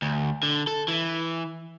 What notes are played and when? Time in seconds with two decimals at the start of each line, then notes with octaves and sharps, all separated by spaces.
0.02 D2
0.43 D3
0.67 A4
0.88 E3